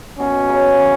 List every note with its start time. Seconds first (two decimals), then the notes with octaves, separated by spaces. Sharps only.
0.19 B2 C#4
0.49 C#3
0.72 C#3
0.78 E3